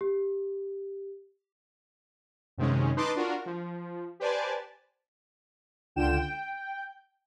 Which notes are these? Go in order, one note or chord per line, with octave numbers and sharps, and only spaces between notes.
G4
F#2 C3 D#3 G#3 C#4
D#4 B4 D#5 A5 C6 D6
D4 F4 F#4 A#4
F3
G4 B4 C5 D5 G#5 A5
C#2 D3 F4 G5 E7
G5